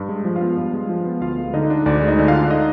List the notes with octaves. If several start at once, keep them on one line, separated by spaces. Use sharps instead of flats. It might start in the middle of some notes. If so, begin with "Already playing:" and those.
Already playing: G2
G#3
F3
F4 F5
B3
G2
G#3
F3
B3
D2 F4 F5
G#3
D3 D#4 D#5
D4
D2 D4 D5
G#3
D#4 D#5
D3
F4 F5
D4
F5
D#4 D#5